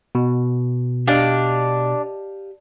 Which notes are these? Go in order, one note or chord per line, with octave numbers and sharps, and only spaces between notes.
B2
D4 G4 D#5 F5